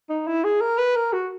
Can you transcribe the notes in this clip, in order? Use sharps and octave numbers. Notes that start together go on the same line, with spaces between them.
D#4
E4
G#4
A#4
B4
A#4
F#4